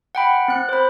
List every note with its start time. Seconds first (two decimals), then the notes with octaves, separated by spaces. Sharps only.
0.15 F#5 G5 B5
0.48 C4 F#6
0.69 C5 B5